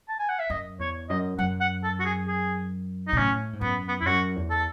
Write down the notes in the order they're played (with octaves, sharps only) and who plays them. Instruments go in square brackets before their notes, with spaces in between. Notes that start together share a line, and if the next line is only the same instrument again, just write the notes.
[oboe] A5
G#5
F#5
E5
[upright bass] F#2 [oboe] D#5
[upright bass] E2 [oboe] C#5
[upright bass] F#2 [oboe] D#5
[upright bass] F#2 [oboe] F#5
[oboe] F#5
A4
F#4
G#4
G#4
D#4
[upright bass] B2
[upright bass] A2 [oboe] C#4
[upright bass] G#2
[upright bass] F#2 [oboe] B3
[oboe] B3
[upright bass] E2 [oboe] E4
[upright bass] F#2 [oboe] F#4
[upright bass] E2
[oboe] A4